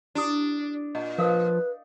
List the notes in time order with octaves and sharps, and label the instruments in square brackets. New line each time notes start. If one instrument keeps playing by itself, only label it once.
[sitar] D4 [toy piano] E4 G4 D#6
[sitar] A#2 [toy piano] D#5
[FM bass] F3 [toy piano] A#4 F5 D#6 [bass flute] B4